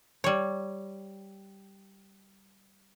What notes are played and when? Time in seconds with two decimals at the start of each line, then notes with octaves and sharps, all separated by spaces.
0.24 G3 C#5